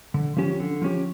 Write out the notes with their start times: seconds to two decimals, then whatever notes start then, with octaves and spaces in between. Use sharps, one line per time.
0.14 D3
0.37 F3 C#4 G4
0.60 D3
0.81 F3 C#4 G4